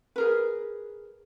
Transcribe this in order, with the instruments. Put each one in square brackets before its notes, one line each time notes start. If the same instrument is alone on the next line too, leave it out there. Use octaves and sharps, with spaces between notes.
[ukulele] G#4 A#4 B4